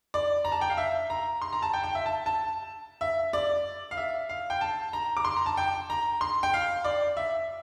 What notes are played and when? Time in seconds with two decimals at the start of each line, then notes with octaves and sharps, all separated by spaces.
0.14 D5
0.45 A#5
0.52 A5
0.61 G5
0.70 F5
0.78 E5
1.10 A#5
1.42 C6
1.53 A#5
1.62 A5
1.73 G5
1.83 G5
1.95 E5
2.06 A5
2.26 A5
3.01 E5
3.33 D5
3.91 F5
3.97 E5
4.29 F5
4.50 G5
4.61 A5
4.93 A#5
5.17 D6
5.25 C6
5.36 A#5
5.46 A5
5.57 G5
5.90 A#5
6.21 C6
6.43 G5
6.54 F5
6.84 D5
7.17 E5